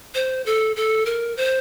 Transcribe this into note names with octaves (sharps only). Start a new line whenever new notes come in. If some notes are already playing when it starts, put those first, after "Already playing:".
C5
A4
A4
A#4
C5